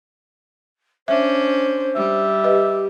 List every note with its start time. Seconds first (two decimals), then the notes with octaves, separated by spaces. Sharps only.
1.08 C#4 D4 C5 E5
1.95 G3 E5
2.44 G4 B4 D#5